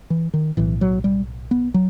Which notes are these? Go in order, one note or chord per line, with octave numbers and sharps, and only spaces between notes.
E3
D#3
B1 A2 E3
F#3
G3
B3
F#3